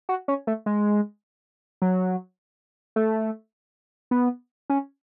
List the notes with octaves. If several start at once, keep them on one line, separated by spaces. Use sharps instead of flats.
F#4
C#4
A3
G#3
F#3
A3
B3
C#4